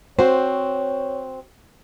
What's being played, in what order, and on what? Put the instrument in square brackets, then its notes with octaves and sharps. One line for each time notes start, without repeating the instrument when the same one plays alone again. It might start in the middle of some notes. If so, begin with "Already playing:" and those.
[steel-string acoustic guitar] C4 F#4 [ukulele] C5 [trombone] C#5